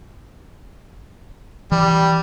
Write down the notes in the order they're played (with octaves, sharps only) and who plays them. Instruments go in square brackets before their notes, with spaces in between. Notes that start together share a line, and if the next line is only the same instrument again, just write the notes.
[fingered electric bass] E3 [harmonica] G3